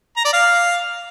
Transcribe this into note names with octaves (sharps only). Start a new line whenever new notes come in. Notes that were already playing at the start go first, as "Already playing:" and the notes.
A#5
D5
F5